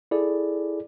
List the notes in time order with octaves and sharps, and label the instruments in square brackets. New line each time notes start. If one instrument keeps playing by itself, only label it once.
[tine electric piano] E4 G#4 A4 D5